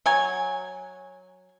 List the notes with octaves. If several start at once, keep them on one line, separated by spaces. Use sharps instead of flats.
F#3 G#5